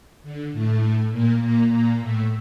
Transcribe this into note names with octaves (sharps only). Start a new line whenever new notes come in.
D3
A2 A3
A#2 A#3
A#2 A#3
A#2 A#3
A2 A3